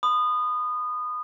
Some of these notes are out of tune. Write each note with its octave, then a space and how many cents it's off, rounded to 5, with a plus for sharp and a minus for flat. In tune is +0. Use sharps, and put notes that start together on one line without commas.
B5 +35 D#6 -20